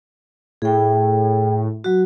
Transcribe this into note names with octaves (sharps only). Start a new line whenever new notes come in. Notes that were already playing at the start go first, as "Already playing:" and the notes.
A2 G#4 G5
F#3 F#4